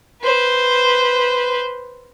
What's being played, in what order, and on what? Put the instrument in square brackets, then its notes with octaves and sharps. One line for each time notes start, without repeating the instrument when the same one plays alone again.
[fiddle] B4 C5